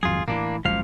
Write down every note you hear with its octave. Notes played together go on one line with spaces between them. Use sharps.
G#1 F2 F#3 F4 G#4
A2 D#3 E3 A#3 D4
F#1 C#2 A#2 F3 F5